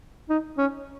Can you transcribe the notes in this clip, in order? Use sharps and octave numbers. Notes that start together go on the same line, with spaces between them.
D#4
C#4